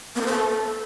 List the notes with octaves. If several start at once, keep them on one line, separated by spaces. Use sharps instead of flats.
B3
A#4
C5
A4